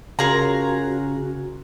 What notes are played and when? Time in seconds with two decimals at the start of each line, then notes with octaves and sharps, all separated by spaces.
0.19 C#3 F4 F#4 G#4 A#4 C#5 A#5